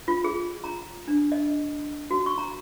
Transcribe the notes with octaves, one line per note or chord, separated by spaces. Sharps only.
F4
G#4
A#5
D4
D#5
F#4
C#6
A#5